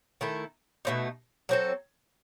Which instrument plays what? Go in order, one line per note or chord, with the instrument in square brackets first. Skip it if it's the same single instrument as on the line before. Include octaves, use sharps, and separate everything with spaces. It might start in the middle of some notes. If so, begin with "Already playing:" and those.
[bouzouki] D#3 A3 E4 A4
B2 A3 C4 D#4
F#3 C4 F#4 A4